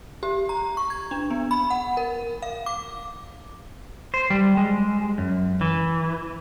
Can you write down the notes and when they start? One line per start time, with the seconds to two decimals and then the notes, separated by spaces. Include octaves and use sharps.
0.23 G4
0.49 A#5
0.77 C#6
0.90 G#6
1.11 D4
1.30 B3
1.51 B5
1.70 F#5
1.97 A#4
2.42 F5
2.66 D6
4.14 C5
4.30 G3
4.57 G#3
5.18 F#2
5.61 E3